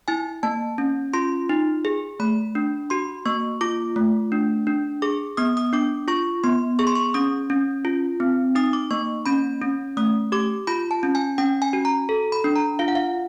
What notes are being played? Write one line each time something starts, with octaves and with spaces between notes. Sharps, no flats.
E4 G#5
A#3 A5
C#4
F4 C6
D#4
G#4
A3 B5
D4
F#4 C6
A#3 C#6
F4 D6
A3
D4
D4
G#4 D6
B3 D#6
D#6
D4 D6
F4 C#6
B3 C6
G#4 C#6
C6
C#6
C#4 D#6
C#4
F4
C4
D#4 D#6
D6
A#3 C#6
C#4 B5
C#4
A3 D#6
G4 D6
F4 B5
A5
C#4
G#5
C#4 G5
G#5
F#4
A#5
A4
B5
D4
A#5
F4 F5
F#5
F5